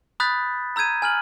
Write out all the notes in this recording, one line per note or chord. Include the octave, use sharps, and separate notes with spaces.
B5 D#6 F#6 G6 A6 B6
A#5 E6 G6 G#6 D#7
G#5 F6 F#7